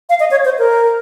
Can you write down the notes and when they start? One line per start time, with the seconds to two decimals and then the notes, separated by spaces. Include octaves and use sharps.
0.09 F5
0.20 D#5
0.31 C#5
0.45 C5
0.59 A#4